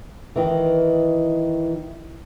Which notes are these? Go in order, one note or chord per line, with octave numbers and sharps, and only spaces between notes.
D#3 E3